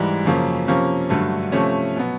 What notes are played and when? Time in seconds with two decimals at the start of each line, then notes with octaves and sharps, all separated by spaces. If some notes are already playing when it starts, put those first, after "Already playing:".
Already playing: G#2 E3 G3
0.25 F#2 C#3 F3 A#3 C#4
0.67 C3 F3 A#3 C#4
1.10 G2 D3 F#3 A3
1.52 C3 F3 A3 C#4
1.96 B2 F#3 B3